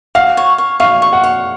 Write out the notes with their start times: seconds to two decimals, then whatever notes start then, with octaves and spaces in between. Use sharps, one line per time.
0.15 F#4 F5
0.37 C#5
0.58 C#5
0.80 C#5 F5
1.02 C#6
1.13 F#5
1.24 C#5